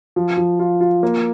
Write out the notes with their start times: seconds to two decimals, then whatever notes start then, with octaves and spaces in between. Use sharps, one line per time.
0.16 F3
0.37 F3
0.59 F4
0.81 F4
1.03 A#3